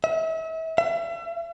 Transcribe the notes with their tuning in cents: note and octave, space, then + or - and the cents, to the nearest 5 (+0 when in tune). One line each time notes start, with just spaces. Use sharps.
E5 -35
E5 +35